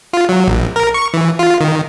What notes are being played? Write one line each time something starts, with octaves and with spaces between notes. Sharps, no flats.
F4
F#3
A#1
A#4
C#6
E3
F4
D#3